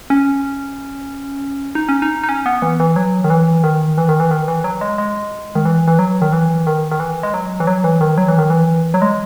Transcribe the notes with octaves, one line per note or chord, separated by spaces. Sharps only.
C#4
D#4
C#4
D#4
D#4
C#4
B3
E3
E3
F#3
D#3
E3
D#3
E3
D#3
E3
D#3
E3
F#3
G#3
G#3
D#3
E3
E3
F#3
D#3
E3
D#3
D#3
E3
G#3
F#3
E3
F#3
E3
D#3
F#3
E3
D#3
E3
F#3
G#3